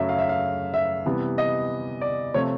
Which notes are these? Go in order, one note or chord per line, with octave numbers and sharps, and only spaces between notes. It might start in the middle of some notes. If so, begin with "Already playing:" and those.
Already playing: F#2 C#3 F#3 A3 E5
F5
E5
F5
E5
C3 E3 G3 B3
D#5
D5
C3 F3 A3 C4 C#5